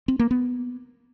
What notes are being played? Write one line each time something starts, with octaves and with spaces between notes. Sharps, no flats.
C4
A#3
B3